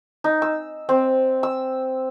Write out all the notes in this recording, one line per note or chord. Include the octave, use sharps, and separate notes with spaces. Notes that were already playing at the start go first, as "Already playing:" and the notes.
D#4
E6
C4
E6